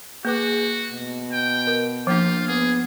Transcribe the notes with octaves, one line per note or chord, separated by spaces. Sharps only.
A#3 F#4 G#4 B4 D6
B2
G5
A#4
F3 A#3 D4 F4
B3 G#4